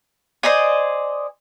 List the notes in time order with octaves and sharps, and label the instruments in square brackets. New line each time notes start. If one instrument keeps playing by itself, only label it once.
[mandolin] C5 D5 D#5 G#5